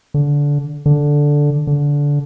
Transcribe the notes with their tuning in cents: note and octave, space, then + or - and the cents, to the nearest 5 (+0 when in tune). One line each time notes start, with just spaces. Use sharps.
D3 -20
D3 -5
D3 -20